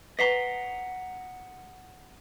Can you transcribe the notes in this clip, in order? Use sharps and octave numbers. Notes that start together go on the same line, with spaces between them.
B4 D#5 F#5 A#5 B6 C7 G7